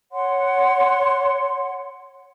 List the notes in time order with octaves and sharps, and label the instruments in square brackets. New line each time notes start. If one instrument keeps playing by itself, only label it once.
[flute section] C#5 F#5 C6